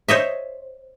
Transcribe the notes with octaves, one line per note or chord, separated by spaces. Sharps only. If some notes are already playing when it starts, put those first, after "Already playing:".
C5 C#5 D#5 E5